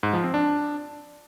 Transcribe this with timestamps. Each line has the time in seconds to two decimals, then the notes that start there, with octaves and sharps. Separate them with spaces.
0.03 G#2
0.13 F3
0.24 C4
0.34 D4